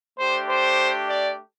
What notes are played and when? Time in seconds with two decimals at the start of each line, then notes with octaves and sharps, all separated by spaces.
0.19 A3 D4 G4 C5
0.49 C5
1.09 D5